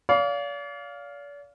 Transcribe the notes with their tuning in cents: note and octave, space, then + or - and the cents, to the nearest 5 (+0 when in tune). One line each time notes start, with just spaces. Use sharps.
D5 -45 F5 +0